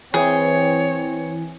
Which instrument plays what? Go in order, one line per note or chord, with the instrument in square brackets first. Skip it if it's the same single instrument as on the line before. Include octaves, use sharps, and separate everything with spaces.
[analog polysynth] E3 [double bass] C4 [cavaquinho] G#4 G5 [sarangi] C#5